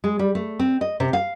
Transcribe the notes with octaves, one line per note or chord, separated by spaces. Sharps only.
G#3
G3
A3
C4
D#5
C3
F5